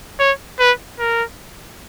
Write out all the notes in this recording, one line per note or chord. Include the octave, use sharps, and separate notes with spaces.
C#5
B4
A#4